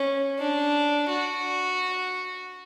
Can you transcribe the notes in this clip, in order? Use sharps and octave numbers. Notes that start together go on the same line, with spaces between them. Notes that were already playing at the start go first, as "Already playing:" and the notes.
Already playing: C#4
D4
F#4